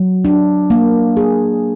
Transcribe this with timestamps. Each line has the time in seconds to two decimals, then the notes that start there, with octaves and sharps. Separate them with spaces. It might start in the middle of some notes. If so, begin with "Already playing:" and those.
Already playing: F#3
0.25 D4
0.70 A#3
1.17 G#4